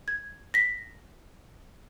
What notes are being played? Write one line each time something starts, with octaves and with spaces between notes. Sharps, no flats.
G#6
A#6 B6